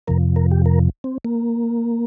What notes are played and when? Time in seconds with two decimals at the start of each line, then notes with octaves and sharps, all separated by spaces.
0.07 F2 C3 F3 A#4
0.36 A#4
0.51 G4
0.66 A#4
1.04 C4
1.25 A#3